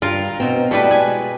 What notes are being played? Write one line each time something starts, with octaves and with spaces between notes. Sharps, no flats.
G2 F4 A#4
B2 C4
B2 G3 A3 E4 A4 B4
G#3 G#5